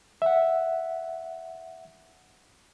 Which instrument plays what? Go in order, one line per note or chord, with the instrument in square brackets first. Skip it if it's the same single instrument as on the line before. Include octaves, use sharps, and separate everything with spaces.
[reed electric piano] E5 F#5